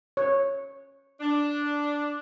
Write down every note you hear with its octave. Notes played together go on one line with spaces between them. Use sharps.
C#5
D4